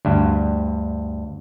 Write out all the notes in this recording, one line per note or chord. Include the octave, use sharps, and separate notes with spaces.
D2 G2